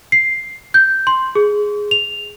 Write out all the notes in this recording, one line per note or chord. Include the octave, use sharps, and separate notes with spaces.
C7
G6
C6
G#4
F7